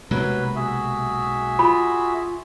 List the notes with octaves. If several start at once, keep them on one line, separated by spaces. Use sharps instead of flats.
B1 C3 F#3 G#3 A#3 B4
F#4 G#4 E5
F4 B5